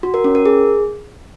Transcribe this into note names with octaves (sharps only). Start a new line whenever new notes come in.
F#4
A#4
C#4
A#4
G#4